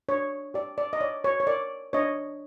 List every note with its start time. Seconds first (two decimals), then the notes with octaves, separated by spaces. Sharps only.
0.09 D4 C#5
0.54 G4 D5
0.78 D5
0.93 D#5
1.01 C#5 D5
1.24 C#5
1.40 C#5
1.47 A#4 D5
1.93 D4 C#5 D#5